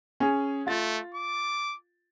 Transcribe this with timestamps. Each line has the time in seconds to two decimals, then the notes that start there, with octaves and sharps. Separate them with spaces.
0.20 C#4 G#4
0.67 A3 F4 A6
1.14 D6